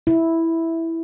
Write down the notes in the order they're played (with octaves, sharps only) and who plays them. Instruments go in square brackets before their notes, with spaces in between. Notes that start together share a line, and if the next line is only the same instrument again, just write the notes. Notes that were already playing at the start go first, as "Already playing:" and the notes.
[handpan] E4